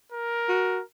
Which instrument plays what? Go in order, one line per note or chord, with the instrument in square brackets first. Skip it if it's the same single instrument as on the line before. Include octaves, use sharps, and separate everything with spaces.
[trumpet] A#4
[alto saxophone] F#4